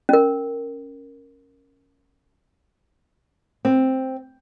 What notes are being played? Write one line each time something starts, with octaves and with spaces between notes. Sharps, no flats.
C#4 A#4
C4